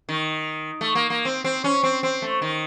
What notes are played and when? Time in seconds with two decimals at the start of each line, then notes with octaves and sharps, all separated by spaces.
0.09 D#3
0.81 A3
0.95 A#3
1.10 A#3
1.25 C4
1.44 C4
1.64 C#4
1.83 C4
2.03 C4
2.22 A3
2.42 D#3